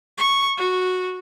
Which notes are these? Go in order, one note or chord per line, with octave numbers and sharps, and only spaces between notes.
C#6
F#4